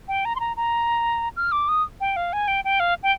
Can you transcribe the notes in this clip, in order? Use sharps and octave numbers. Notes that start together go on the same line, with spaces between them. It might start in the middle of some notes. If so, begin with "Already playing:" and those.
G5
A#5
C6
A#5
A#5
F6
D6
D#6
G5
F5
G#5
G5
G5
F5
G5